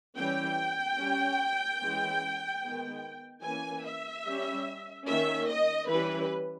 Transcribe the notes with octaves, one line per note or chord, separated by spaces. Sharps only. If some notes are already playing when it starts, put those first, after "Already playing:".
E3 G3 C#4 G5
G3 C#4
E3 G#3 C#4
D#3 G#3 B3
E3 A#3 C#4 G#5
E5
G3 C#4
D#3 A#3 C#4 E5
D#5
E3 G3 C#4 B4